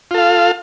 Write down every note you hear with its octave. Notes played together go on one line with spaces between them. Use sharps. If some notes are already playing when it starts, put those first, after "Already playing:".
F4 A4 F5